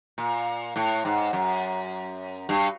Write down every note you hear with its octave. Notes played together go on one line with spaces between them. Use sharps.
A#2
A2
G#2
F#2
G2